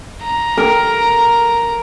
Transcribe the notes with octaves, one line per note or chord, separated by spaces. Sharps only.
A#5
A#4